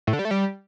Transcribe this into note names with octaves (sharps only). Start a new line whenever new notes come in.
A2
D3
G3
A3
G3